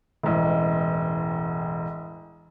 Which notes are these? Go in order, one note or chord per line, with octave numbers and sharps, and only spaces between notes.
E1 A1